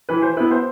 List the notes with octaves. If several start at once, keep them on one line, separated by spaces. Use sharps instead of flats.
E3 B4
C5
B3 E4 B4
C5